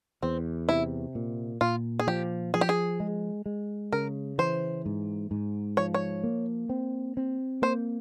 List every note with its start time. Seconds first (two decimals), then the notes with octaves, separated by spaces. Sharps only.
0.22 E2 C4
0.69 C3 E4
1.15 A#2
1.61 A#2 F4
1.99 G#4
2.07 F3 G4
2.54 F3 G#4
2.61 G4
2.69 G#4
3.00 G#3
3.46 G#3
3.92 C#3 A#4
4.38 E3 C5
4.86 G#2
5.31 G#2
5.77 F3 C#5
5.94 C#5
6.24 A#3
6.69 C4
7.17 C4
7.62 A#3 C5